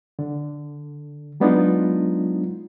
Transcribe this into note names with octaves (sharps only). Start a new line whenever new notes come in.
D3
F#3 G#3 B3 D4 D#4 F4